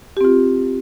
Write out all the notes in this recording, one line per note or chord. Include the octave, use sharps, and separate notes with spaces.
C4 F4 G4